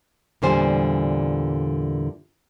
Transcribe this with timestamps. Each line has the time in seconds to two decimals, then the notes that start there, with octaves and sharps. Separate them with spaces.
0.42 E2 A#2 D3 G3 C5 G#5